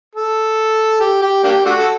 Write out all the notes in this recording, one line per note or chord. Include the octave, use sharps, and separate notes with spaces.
A4
G4
G4
A#3 D4 G4
A3 D4 F#4
A4